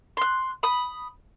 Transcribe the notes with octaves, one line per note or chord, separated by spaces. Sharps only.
C6 F#6
B5 D#6